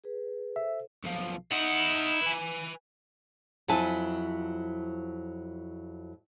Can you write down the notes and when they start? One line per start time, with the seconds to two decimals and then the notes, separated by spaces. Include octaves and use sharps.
0.04 G#4 B4
0.56 A4 C5 E5
1.04 B1 F3
1.52 D#4 E4 F#5
2.22 B4 G#5
3.68 F2 F#3 E4 F4 G#5 A5